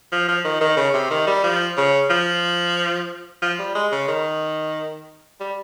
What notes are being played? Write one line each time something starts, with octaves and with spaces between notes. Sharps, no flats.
F3
F3
D#3
D#3
C#3
C3
D#3
G3
F3
C#3
F3
F3
G3
G#3
C#3
D#3
G3